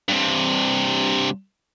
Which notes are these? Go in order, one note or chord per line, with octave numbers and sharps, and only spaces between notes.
G2 C3